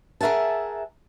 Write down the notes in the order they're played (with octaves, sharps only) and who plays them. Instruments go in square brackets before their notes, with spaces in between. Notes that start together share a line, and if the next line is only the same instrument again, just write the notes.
[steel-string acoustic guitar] G#4 A#4 E5 F#5 A5